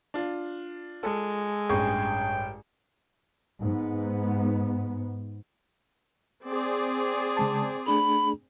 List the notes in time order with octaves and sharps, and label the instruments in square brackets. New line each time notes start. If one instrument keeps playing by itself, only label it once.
[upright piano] D4 F4
[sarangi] G#3 [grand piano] A4
[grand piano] A1 G2 [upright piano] G#4 G#5 C#6 [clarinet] G5
[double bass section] G#2 B3
[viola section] C4 G#4 D5
[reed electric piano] C#3 G#3 A5
[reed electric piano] A3 D4 G#4 [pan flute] B5